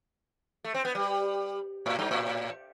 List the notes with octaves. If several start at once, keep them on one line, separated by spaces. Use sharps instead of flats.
A3
C4
B3
G3
A2
G2
A2